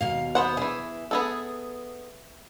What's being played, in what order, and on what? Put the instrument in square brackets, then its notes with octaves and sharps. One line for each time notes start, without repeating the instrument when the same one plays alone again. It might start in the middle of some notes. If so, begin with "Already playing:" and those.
[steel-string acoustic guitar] D#2 B2 F5
[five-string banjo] B3 C5 F#5
[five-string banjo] E3 G#4 [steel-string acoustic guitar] E5
[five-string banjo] B3 G#4 A4